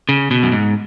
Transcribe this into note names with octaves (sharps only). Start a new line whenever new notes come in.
C#3
B2
F#2
G#2